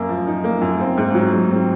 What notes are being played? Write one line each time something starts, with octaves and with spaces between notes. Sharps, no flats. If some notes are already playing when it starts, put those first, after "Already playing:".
Already playing: F#2 A#3
F3
D#4
A#3
F#2
C4
G#2
F#3
G#2
C4